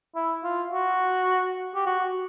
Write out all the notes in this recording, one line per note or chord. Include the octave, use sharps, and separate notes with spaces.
E4
F4
F#4
G4
F#4